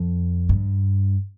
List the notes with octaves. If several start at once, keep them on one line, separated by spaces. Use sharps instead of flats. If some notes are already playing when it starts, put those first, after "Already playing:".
Already playing: F2
G2